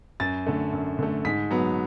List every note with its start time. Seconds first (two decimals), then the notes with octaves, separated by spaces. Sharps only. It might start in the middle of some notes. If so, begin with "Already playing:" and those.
0.20 F#2 A6
0.46 D3 A3
0.73 F#2
0.99 D3 A3
1.25 G#2 B6
1.51 F#3 B3